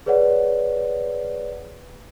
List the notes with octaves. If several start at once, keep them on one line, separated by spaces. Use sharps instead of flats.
G#4 B4 C#5 D5 F#5